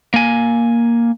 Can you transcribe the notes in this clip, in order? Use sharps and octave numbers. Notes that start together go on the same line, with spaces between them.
A#3 G#5